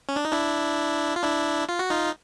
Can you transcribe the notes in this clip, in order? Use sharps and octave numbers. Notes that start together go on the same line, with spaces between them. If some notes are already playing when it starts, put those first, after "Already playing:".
C#4
D4
D#4
D4 E4
F4
D4 E4
F4
F#4
D#4 F4